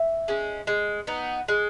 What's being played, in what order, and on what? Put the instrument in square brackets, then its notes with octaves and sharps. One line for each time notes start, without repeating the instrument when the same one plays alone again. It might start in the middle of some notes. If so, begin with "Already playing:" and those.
Already playing: [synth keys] E5
[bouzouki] G#3 C#4
G#3
B3 D#4
G#3